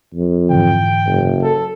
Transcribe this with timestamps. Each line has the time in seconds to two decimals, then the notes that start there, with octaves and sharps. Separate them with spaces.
0.14 F2
0.50 G#2 D3 E3 G5
1.06 F#1
1.43 A4